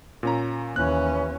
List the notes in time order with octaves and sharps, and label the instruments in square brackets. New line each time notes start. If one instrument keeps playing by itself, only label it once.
[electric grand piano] A#2 C#4 A#5
[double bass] D#2 C#4 [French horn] E3 [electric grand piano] F#6